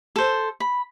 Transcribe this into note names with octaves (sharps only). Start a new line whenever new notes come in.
A4 C5
B5